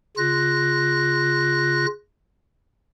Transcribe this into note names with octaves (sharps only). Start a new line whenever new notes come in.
C#3 F4 F#6 A#6